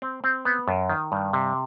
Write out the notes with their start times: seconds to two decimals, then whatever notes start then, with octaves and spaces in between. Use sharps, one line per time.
0.02 C4
0.24 C4
0.45 B3
0.68 F#2
0.89 D#3
1.12 G2
1.33 C3